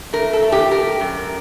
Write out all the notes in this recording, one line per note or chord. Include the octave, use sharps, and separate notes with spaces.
A3 A#4
A4
A3
G4
A3 A#4
F#2